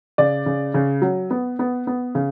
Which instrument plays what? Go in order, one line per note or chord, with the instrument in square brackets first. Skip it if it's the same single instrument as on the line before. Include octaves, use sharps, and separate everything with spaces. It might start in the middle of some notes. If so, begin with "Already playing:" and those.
[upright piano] C#3 D5
C#3
C#3
F#3
B3
B3
B3
C#3